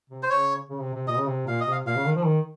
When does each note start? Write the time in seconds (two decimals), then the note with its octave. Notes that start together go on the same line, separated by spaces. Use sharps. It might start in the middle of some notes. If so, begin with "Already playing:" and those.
0.10 C3
0.23 C5
0.30 C#3 C#5
0.69 C#3
0.81 C3
0.95 C3
1.08 A#2 D#5
1.18 C#3
1.28 C3
1.47 A#2 F5
1.60 D#5
1.66 C3
1.72 F5
1.86 A#2 F5
1.96 C#3
2.06 D#3
2.16 F3
2.25 D#3